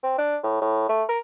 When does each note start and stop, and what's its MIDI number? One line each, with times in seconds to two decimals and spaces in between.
0.04 0.17 60
0.19 0.38 62
0.44 0.57 45
0.62 0.88 45
0.89 1.04 57
1.09 1.19 70